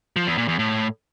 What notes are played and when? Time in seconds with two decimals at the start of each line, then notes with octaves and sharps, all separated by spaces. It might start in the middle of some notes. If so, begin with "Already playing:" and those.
0.16 F3
0.27 E2
0.38 A#2
0.48 E2
0.59 A2